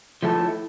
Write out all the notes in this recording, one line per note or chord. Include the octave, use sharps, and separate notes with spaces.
F3 A3 E4 A4